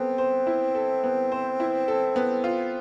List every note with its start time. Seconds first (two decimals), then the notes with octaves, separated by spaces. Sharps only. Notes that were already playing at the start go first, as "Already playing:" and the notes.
Already playing: B3 C4 A4
0.18 C5
0.47 E4
0.75 A4
1.04 B3
1.32 C5
1.60 E4
1.88 A4
2.16 B3
2.44 F4